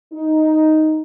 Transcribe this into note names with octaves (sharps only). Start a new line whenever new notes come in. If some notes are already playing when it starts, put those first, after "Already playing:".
D#4